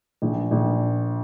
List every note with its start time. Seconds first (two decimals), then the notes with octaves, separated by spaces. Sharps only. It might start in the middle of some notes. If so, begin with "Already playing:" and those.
0.22 A#1
0.51 A#1